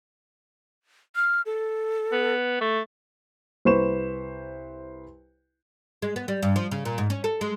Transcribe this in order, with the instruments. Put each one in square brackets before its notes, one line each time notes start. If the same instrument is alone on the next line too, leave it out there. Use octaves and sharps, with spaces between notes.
[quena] F6
A4
[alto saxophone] B3
A3
[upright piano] C2 B4 C5 C#6 E7
[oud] G#3
B3
G3
G2
F3
C#3
A#2
G#2
C#4
A4
G#3